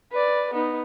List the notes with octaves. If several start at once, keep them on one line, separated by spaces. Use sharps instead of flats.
B4 D5
B3 D#4